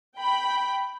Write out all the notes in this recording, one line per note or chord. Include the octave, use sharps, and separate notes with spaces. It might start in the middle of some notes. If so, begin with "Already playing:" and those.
G5 B5